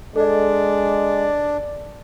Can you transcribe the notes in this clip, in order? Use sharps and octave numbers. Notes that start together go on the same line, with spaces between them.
G#3 D4 A4 D5 D#5